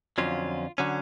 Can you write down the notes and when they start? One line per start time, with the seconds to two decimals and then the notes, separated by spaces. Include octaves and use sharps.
0.18 F2 D3 F#3 C#4 F4
0.78 D3 F#3 C#4